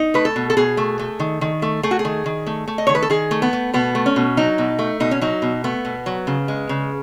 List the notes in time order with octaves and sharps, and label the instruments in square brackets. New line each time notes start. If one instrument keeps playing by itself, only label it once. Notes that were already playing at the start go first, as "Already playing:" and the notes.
Already playing: [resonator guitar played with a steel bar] D#4
A3 B4
A4
B2
A4
B2 G#4
A3
A3
D#3
D#3
A3
A3 G#4
F#4
G#4
D#3
D#3
A3
A3
D#5
D#3 C#5
B4
A4
D#3 G#4
A3
B3
A3
B2 B3
A3
C#4
B2
F#3 D#4
B2
A3
B2 D#4
C#4
F#3 D#4
B2
A3 B3
B2
F#3
C#3
G#3
C#3